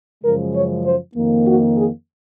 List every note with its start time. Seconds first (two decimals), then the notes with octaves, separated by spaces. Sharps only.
0.23 F#2 C#3 F3 G#3 A#4
0.54 C#5
0.85 C5
1.15 F2 D#3 A#3
1.46 F#4
1.77 G#4